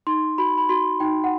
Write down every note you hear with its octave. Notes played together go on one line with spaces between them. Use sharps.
D#4 C6
F#4 B5
B5
F#4 C6
D#4 G5
F#5